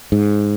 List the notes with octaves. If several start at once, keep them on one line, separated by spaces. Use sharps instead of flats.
G#2